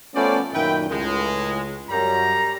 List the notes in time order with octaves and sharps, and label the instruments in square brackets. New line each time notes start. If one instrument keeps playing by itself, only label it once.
[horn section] F3 D5 [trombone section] A3 B3 C#4
[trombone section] F#2 A#2 D#3 [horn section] B4 E5 G5
[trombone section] C#2 [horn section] A2 G#3
[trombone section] F#2 [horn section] G3 A#5